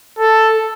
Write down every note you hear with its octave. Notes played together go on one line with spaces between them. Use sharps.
A4